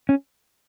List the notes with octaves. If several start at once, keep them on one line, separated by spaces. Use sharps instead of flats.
C#4